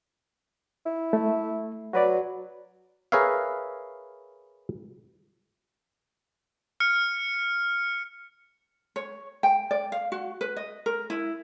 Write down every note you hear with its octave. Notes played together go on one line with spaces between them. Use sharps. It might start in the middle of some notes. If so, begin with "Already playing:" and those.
E4
A3
F#3 F#4 B4 D5
G#4 A#4 B4 C#5 E5 F5
F6 C#7
C#5
G5
D5
F5
F#4
B4
D#5
A#4
E4